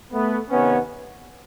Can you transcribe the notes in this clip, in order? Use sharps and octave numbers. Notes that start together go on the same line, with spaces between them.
A3 B3
C3 D#3 B3 C#4